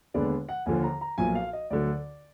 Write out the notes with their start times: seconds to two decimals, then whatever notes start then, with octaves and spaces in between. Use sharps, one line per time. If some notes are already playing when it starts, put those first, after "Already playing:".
0.14 D#2 D3 G#3 B3 D4 D5
0.49 F#5
0.66 D#2 D3 F3 G#5
0.83 A#5
1.01 A#5
1.18 B1 A#2 F3 G#5
1.35 F5
1.53 D#5
1.70 D2 D3 F#3 D5